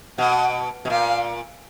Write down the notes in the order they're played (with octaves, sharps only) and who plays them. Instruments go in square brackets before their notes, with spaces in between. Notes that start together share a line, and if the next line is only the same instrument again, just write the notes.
[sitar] B2 [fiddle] F#5
[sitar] B2
[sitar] A#2 [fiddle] F5